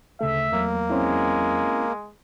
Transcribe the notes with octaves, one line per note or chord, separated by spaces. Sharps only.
D2 C#3 A3 A4 E5
E2 F#3 A#3
G#3 C4 C#4 E4